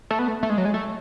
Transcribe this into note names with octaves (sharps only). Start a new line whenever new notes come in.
A3
B3
A3
A3
G#3
F#3
G#3
A3